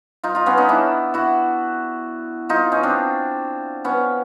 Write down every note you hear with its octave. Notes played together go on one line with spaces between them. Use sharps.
D#4 F4
D#4 F4
B3 C#4
C#4 D#4
D4 E4
E4 F#4
D#4 F4
C#4 D#4
C4 D4
B3 C#4